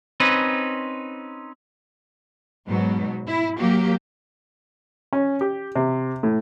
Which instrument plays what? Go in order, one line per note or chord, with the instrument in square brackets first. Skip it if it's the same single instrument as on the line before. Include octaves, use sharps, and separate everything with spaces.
[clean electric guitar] C4 C#4 D#4 B4
[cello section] G#2 B2 F#3
E4
F#3 A#3 G4
[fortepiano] C#4
G4
C3
A2